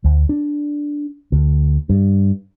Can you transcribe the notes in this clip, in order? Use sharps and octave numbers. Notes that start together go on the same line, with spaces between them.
D2
D4
D2
G2